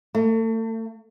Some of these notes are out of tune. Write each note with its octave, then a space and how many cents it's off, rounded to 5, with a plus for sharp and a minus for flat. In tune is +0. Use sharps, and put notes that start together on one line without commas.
A3 +35